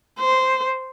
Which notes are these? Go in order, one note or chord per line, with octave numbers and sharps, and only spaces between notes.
C5